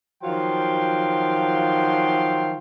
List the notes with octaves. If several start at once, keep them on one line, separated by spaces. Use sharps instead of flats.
D#3 F3 F#3 F5 G5 C6